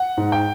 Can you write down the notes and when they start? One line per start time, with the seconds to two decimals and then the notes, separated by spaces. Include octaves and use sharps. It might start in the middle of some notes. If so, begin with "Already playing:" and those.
Already playing: F#5
0.17 G#2
0.32 G5